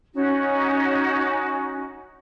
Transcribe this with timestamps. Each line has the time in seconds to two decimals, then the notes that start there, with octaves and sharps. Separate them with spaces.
0.13 C#4 D#4 F#4